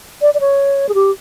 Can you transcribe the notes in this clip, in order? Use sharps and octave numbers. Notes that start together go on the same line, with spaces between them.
D5
D5
C#5
G#4
G4